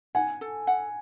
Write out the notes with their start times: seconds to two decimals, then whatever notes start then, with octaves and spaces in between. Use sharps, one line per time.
0.15 F#5 G#5
0.41 A4
0.67 F#5